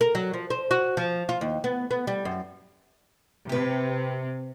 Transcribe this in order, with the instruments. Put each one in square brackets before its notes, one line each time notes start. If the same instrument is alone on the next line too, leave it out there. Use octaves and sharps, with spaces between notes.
[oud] A#4
F#3
F3
C5
F#4
F3
F4
D#2
B3
B3
G3
F#2
[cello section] C3 [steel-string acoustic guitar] G4 B4